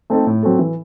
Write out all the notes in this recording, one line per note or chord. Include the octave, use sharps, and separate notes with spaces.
A3 C4 D#4 A4
A2
F#3 C4 F#4 A4
E3